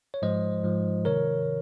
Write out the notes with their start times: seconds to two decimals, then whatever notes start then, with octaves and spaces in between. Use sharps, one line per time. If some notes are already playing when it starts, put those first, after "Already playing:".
0.14 C#5
0.22 G#2 F3 G#3 C5 D#5
0.64 G#2 F3 G#3
1.05 C3 D#3 A#4 C#5